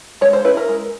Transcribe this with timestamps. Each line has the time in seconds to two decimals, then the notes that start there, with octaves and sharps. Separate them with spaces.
0.21 G#3 C#5
0.33 C5
0.45 C#4 E4 B4
0.57 A#4
0.68 G#3